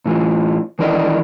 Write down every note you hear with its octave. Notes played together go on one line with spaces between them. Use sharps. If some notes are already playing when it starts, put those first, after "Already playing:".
A2 E3 F4
D#3 E3 E4 A#4 D5 D#5